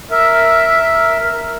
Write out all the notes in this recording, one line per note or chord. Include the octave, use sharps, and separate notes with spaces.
A#4 E5